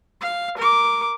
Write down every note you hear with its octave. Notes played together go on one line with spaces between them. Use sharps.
F5
A#4 D6